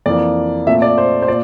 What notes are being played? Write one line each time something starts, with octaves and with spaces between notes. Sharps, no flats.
F2 E3 A#3 D5
A#2 A3 C4 E5
D5
C5
C5
A#2 D5